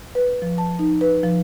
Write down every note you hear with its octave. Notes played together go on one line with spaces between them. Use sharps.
B4
F3
A5
D#4
B4
F3